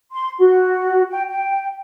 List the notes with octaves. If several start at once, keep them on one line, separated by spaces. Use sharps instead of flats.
C6
F#4
G5
G5